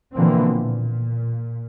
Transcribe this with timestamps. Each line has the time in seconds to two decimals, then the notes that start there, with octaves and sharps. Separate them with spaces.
0.15 B2 D3 E3 F3 A#3 C4
0.51 A#2